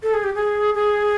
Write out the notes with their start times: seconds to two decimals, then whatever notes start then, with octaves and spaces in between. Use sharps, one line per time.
0.03 A4
0.14 G#4
0.24 G4
0.35 G#4
0.75 G#4